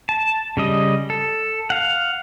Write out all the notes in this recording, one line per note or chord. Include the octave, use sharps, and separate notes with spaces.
A5
C#3 G3 D#5
A4
F5 F#5